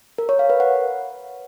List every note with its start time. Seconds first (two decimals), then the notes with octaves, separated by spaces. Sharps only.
0.18 A#4
0.29 C#5
0.39 F5
0.50 B4
0.60 F#5